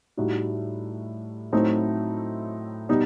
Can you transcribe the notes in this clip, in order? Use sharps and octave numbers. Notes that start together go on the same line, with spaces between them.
A2 G3 D#4 F#4
A2 F#3 A3 C4 D#4
B2 G3 D#4